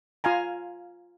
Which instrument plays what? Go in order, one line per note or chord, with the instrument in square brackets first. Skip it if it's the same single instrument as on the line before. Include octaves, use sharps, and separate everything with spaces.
[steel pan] F4 F5 G#5 A#5